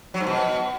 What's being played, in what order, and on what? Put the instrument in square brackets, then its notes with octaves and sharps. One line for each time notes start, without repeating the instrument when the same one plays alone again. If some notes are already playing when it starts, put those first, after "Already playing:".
[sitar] F#3
G#2
B2